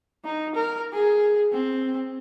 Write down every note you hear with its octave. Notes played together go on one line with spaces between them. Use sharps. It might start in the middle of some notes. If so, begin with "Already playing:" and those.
D#4
A#4
G#4
C4